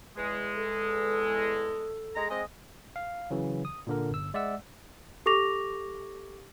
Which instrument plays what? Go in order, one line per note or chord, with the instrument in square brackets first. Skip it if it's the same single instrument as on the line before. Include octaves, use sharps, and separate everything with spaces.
[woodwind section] E2 G#3
[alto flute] A4
[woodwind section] G#3 A#5
G#3 C4 D#5
[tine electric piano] F5
C#3 E3 F#3
D#6
A#2 D3 A#4
G1 E6
G#3 D5 E5 F#5 E6
[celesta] G4 A4 C#6 D6 A#6 F7